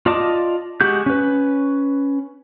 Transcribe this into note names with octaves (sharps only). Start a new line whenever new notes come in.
F4 D5 D#5 A5 D6
G#3 F#4 G4 G6
C#4 B4